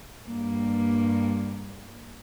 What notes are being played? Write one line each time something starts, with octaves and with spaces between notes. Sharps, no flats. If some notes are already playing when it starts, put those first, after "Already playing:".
G2 G3 A#3